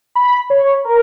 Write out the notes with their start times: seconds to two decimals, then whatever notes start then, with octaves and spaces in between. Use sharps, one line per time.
0.15 B5
0.50 C#5
0.85 A#4